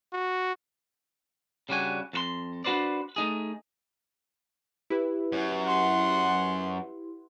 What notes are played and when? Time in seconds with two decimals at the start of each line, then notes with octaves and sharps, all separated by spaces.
0.13 F#4
1.69 C#3 G3 D4 F#4 G#5
2.13 F2 F#4 C6
2.64 D4 F#4 B4 C5 D5
3.16 A3 D#4 G#4
4.90 E4 G4 B4
5.32 F#2
5.64 F#5 C6